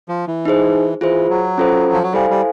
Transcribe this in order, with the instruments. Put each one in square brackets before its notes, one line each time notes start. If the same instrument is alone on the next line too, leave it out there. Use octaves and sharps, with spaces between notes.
[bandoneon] F3
E3
[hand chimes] D#4 G#4 C5
[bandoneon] E3 [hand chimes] F4 G#4 C5
[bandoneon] F#3
[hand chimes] C#4 F4 A4 C5
[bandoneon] F3
F#3
[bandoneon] G3 [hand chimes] E4 A4 C5 F5 G#5
[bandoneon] G3